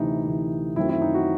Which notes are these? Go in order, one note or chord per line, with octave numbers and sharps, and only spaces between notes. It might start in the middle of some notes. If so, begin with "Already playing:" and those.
Already playing: D2 C3 E3 D#4
D2 C3 E3
F#2 D#3 F#3 A3 C4 E4
E4
D#4
F#4